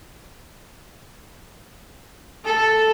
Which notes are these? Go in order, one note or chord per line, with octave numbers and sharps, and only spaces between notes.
A4